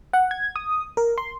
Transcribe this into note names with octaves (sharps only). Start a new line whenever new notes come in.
F#5
G#6
D#6
A#4
C6